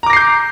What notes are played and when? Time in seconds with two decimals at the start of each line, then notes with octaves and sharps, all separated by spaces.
0.03 A#5
0.06 D6
0.10 A#6
0.13 C7
0.16 G6